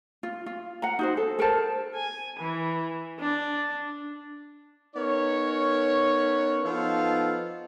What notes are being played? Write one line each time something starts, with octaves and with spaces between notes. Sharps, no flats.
F4
F4
F#5 A#5
D#4 F#4 C5
A4
A4 A#4 C5 A5
G#5
E3
D4
B3 C#4 D#4 A#4 C#5
F3 B3 D#4 F4 A4 F5